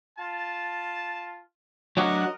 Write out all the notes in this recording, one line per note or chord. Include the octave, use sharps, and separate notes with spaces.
F4 A5
F#3 D4 F#4 A#4 D#5 F#5